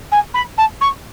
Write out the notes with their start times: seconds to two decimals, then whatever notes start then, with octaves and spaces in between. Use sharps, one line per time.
0.11 G#5
0.34 B5
0.57 A5
0.81 C#6